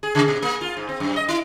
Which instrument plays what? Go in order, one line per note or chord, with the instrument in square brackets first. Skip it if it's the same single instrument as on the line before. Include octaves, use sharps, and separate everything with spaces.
[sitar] G#4
C#3
B2
A#3
F4
G#2
C4
F#2
D#5
E4